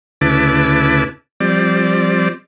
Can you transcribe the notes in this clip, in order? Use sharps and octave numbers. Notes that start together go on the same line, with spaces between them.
D2 C#3 E4 B4 A5 D6
F3 G3 C4 D5